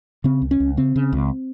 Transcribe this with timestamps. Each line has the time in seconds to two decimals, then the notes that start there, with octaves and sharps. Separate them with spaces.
0.24 C#3 C4
0.42 C#2
0.51 C#4
0.60 C#2
0.77 C#3 C4
0.96 C#3
1.13 C#2